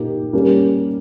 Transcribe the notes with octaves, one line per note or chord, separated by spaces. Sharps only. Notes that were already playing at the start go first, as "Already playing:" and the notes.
Already playing: A#2 A#3 D#4 G4
G3 A#3 C#4 G4